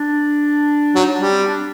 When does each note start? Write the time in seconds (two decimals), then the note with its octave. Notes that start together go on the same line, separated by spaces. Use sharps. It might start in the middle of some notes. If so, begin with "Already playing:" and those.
Already playing: D4
0.95 F#3
1.00 D#4
1.12 D4
1.21 G3
1.30 C4
1.47 D4